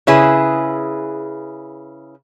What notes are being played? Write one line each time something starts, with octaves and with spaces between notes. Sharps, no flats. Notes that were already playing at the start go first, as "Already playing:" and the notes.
C#3 E4 G#4 B4